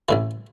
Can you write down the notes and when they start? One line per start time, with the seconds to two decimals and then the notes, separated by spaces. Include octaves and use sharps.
0.09 A1 A2 E3 B4